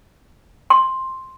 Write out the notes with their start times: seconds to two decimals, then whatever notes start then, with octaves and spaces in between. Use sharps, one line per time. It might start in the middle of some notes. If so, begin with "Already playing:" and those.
0.70 C6